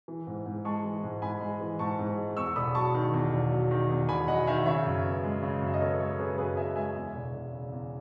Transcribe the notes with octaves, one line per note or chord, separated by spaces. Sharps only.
E3
G#2
G#2
G#3 A5 C#6
E3
G#2
G#2 G#5 B5
G#3
E3
G#2 A5 C#6
G#2
G#3
E2 C#6 E6
E1 B5 D#6
F#3 A5 C#6
D#3
E2
E1
F#3
D#3
E2
E1 G#5 B5
F#3 D#5 F#5
D#3 E5 G#5
C#3 C#5 E5
F#2
B3
G#3
C#3
F#2 E5
D#5
B3 A4 C#5
G#3 A4 C#5
C#3 G#4 B4
F#2 G#4 B4
B3 E5 G#5
G#3 E5 G#5
E2
E1
E1
C#3
E2